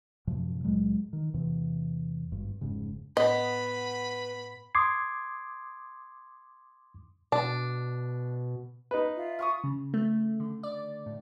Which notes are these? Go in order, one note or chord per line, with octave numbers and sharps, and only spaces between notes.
F#2 A2 C3 F3
C#2 A#2 F#3 G#3
D#3
E2 C3 E3
G#1 G2
F1 G#2 C#3
A2 B3 D#5 B5
C6 D6 D#6 G#6 C7
B2 D4
D#4 B4
F4 E5
F5 C#6 D#6
C#3
A3
D3
D5
A2